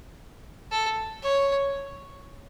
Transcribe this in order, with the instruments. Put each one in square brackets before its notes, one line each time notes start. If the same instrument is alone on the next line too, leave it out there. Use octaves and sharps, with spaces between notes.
[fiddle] A4
C#5